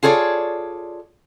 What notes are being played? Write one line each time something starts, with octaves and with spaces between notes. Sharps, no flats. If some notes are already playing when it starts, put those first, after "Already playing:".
F4 G#4 A4 C#5 D5